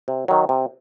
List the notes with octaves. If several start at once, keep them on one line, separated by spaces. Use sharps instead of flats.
C3
D#3 F#3
C3